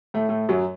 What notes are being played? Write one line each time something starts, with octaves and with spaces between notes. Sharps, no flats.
A2 A3
A2 A3
F#2 F#3